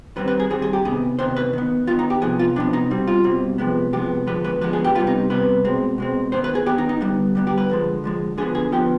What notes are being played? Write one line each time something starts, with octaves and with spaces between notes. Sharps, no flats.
D#3 G3 C4 B4
B4
G#4
D#3 G3 C4 G#4
G#4
G4
C3 D#3 B3 G#4
C3 D#3 B3 C5
B4
D#3 B3
D#3 B3 F4
D#4
G4
C3 F3 B3 G#4
F4
C3 F3 B3 D4
D#4
B2 G3 C4
F4
B2 G3 C4
C3 F3 G#3 B3
C3 F3 G#3 B3 G4
D3 F3 G#3 B3 B4
B4
D3 F3 G#3 B3 B4
G#4
G4
C3 G3 B3 F4
D#4
C3 G3 B3 B4
B2 G#3 C4
B2 G#3 C4
D#3 B3 C5
B4
G#4
D#3 B3 G4
D#4
D#4
D3 G3 B3
D3 G3 B3
G4
B4
D3 F3 G#3
D3 F3 G#3
D3 F3 B3 G#4
G#4
D3 F3 B3 G4